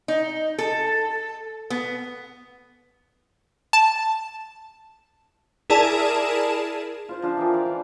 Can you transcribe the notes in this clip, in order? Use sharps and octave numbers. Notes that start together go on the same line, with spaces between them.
D#4
A4
B3
A5
E4 G#4 A#4 D5 A5 E7
F4 C5
F3 D4 F4 A5
E3 G#4 A#4 G5
D5 F5 B5
E3 D4